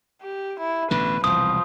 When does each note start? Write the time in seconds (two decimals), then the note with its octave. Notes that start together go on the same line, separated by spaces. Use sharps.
0.21 G4
0.59 E4
0.91 A1 B2 D3 B4
1.24 E1 C2 F3 D#6